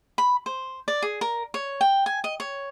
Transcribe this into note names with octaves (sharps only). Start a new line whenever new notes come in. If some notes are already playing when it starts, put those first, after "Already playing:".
B5
C5
D5
G#4
A#4
C#5
G5
G#5
D#5
C#5